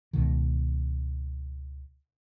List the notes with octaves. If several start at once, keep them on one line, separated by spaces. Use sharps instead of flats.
C#2 B2 D#3